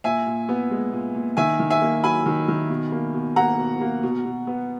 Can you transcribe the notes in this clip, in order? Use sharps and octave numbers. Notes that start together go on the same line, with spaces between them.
A#2 E5 G#5
A#2
B3
G#3
A#2
A#2
D#3 E5 G#5
D#3
E5 G#5
A#3
F#3 G#5 B5
D#3
D#3
B2
A#3
B2
A#3 F#5 A#5
B2
A#3
B2
B2
B3